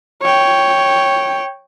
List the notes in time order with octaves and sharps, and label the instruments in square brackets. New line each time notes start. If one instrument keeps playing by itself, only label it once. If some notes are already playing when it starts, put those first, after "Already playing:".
[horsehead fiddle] C#5 G5